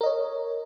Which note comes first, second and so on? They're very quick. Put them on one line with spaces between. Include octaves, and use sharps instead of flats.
A#4 D#5 C#5